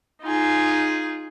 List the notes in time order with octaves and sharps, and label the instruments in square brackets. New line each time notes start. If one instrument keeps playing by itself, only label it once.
[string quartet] D#4 F4 G#4